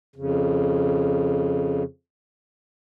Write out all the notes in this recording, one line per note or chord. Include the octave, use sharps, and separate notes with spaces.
F2 C#3